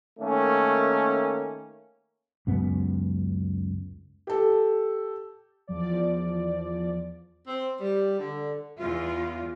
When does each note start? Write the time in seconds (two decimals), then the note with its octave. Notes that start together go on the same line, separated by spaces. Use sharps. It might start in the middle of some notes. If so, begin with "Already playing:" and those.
0.19 D#3 A3 A#3 C#4
2.47 C#2 F#2 B3
4.27 G4 A4
5.67 E2 F3 D5
7.47 C4
7.80 G3
8.20 D3
8.79 E2 F4